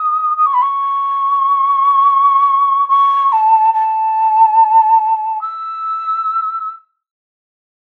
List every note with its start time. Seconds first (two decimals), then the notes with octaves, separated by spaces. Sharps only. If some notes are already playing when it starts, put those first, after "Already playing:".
Already playing: D#6
0.37 D#6
0.46 C#6
0.54 B5
0.62 C#6
2.89 C#6
3.32 A5
3.73 A5
5.41 E6